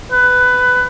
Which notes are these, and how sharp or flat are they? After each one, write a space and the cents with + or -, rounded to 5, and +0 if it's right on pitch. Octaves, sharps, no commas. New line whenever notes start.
B4 +15